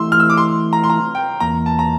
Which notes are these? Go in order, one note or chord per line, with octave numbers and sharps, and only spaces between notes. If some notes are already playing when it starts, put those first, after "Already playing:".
Already playing: E3 A3 E4 C6 E6
F6
E6
D6
C6
A#5
C6
A#5
G5
E2 E3 A#3 A#5
A5
A#5